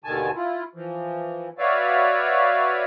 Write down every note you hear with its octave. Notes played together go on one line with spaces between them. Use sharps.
D#2 B2 D3 D#3 G#5 A5
E4 F4
E3 F3
F#4 B4 C#5 D5 E5 F5